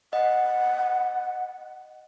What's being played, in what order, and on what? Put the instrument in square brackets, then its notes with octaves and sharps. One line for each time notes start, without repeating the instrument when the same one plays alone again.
[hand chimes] D#5 [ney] F#5